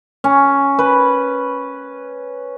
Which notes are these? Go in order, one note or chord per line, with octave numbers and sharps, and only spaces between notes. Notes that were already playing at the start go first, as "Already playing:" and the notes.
C#4
B4